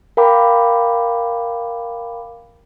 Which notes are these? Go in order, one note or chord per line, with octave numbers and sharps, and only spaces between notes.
A#4 F5 G5 A#5 B5 D6